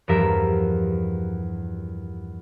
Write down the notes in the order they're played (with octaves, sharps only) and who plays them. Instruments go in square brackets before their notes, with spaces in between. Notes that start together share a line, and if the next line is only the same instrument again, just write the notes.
[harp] E2 G2 F3 G3 A#4 E5